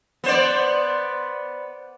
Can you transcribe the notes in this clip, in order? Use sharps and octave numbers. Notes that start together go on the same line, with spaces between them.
B3 C5 D5